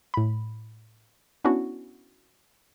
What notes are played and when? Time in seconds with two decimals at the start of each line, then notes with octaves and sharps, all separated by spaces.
0.14 A2 B5
1.44 B3 C#4 D4 E4 F#4